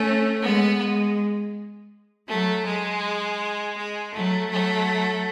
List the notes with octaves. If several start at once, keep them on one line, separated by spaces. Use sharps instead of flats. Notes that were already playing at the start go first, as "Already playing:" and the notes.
Already playing: A3 C#4
G#3 B3
G#3
F#3 A3
G#3
G#3
F#3 A3
F#3 A3